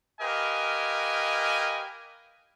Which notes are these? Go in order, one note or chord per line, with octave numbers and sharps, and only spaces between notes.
G4 A#4 B4 D#5 F5 G#5